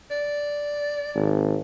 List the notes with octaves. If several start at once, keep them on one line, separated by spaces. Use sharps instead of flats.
D5
G#1